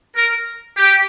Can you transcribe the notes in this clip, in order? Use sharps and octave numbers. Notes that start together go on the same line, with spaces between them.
A#4
G4